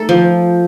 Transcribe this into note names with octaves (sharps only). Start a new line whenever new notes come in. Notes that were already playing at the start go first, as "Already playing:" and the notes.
Already playing: A3 D#4 A4
F3